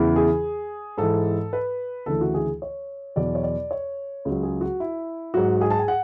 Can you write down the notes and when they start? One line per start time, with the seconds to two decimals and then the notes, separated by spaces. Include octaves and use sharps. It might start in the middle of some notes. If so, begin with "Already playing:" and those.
Already playing: E2 C#3 E3
0.16 G#4
0.98 G#2 E3 A4
1.53 B4
2.06 D2 C#3 E3 A4
2.21 F#4
2.34 G#4
2.62 C#5
3.16 E2 B2 F#3 D5
3.35 C#5
3.43 D5
3.71 C#5
4.25 C#2 C#3 F#3
4.43 G#4
4.61 F#4
4.80 E4
5.34 G#2 F#3 F#4
5.61 G#4
5.70 A5
5.79 G#5
5.88 F#5